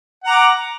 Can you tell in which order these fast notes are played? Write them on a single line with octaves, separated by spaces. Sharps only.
F#5 A#5 D6